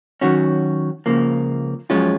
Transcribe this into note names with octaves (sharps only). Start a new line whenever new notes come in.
D#3 F#3 C#4 F#4
C#2 C#3 F3 A#3
F#2 F3 G#3 C#4 F4